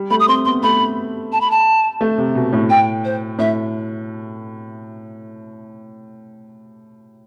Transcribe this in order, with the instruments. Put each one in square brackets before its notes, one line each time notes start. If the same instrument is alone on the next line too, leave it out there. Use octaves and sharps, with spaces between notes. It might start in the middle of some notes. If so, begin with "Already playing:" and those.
Already playing: [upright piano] G3
[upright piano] A3 [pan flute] B5
[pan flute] D#6
[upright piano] C4 [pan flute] C6
[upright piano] B3 [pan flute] C6
[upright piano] A3 [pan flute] B5
[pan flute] A5
B5
A5
[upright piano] A3
C3
B2
A2
[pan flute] G5
C5
[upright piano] A2 [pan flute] E5